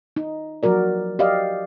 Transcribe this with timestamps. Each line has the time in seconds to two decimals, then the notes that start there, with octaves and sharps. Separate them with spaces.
0.16 D#4
0.63 F3 F#3 F#4 A#4 D5
1.19 G4 D5 D#5 F5